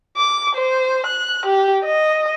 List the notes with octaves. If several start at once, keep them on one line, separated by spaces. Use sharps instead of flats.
D6
C5
F#6
G4
D#5